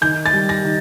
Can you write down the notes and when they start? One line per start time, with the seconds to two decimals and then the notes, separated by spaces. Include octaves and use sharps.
0.01 D#3 G6
0.26 A6
0.33 G3
0.49 A#6
0.65 D#3